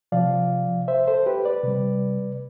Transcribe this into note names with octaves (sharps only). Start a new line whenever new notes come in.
C3 F3 D5 F5
C5 E5
A4 C5
G4 B4
B4 D5
C3 G3